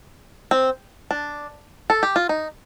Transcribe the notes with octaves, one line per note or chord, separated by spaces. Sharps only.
C4
D4
A4
G4
F4
D#4